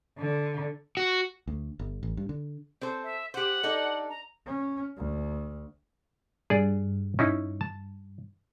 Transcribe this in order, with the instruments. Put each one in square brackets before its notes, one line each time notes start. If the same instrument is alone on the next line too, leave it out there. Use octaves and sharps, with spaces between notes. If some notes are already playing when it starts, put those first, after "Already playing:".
[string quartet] D3
[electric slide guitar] F#4
[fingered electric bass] D2
G1
A1
G2
D3
[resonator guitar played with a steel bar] C4 A4 C5
[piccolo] E5
[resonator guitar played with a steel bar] G4 C5 [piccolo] F#5
[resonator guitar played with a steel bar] D4 D#4 A4
[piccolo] A#5
[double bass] C#4
D2
[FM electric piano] G2 [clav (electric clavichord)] G#4 D5
[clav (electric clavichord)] C#4 D#4 E4
A5